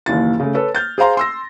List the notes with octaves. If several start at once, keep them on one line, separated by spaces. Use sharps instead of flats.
F#1 D#2 E3 A6
C#3 A3
A4 B4 C#5
F6 G6 A6
G#4 C5 F5 A#5 C6
C6 E6 A#6